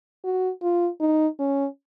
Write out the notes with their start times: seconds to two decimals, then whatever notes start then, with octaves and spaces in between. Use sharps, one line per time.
0.24 F#4
0.62 F4
1.00 D#4
1.39 C#4